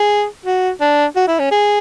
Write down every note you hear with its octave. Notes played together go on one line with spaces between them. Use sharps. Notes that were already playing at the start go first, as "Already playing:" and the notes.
Already playing: G#4
F#4
D4
F#4
E4
C#4
G#4